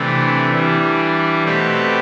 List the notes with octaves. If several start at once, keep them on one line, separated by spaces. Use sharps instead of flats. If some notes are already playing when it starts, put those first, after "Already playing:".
Already playing: C3 E3 A3 D4
E3 G3 D4
B2 A3 C4 G4 B4